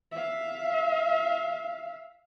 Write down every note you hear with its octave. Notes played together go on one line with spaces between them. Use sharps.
E5 F5